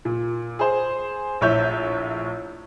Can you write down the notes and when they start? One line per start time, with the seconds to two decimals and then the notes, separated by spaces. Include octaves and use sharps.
0.05 A#2
0.59 G#4 C5
1.41 A#1 A2 C#5 E5 G6